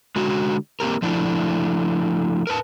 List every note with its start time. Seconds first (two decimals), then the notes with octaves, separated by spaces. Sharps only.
0.16 D3 G#3 F#4
0.80 A#3 C4 G4 A#4
1.02 F3 A3 D4 E4
2.47 A#4 B4 A5